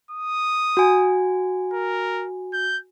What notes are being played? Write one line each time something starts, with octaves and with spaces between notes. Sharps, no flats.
D#6
F#4 G#5
A#4
G6